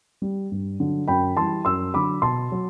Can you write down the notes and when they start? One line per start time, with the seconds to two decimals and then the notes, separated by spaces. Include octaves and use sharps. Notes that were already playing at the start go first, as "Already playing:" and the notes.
0.22 G3
0.52 G2
0.80 D3 F#3
1.08 F#2 G5 B5
1.36 E3 G3 A5 C6
1.65 F#2 C6 E6
1.94 D3 F#3 B5 D6
2.22 B2 A5 C6
2.52 F#3